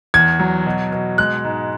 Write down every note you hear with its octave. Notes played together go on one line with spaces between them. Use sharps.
E2 G#6
F#3
B2
B2
G#3 F#6
G#2